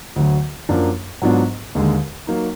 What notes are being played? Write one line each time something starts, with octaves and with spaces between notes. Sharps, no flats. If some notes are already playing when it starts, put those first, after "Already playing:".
D2 D3 F#3
F#2 F3 A#3 D4
G#2 F#3 B3 D4 F4
D#2 D3 G#3
F#3 A#3 D#4